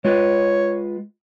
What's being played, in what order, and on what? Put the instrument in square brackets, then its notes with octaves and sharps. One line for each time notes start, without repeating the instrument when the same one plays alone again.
[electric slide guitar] G#3 F4 B4 [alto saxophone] C#5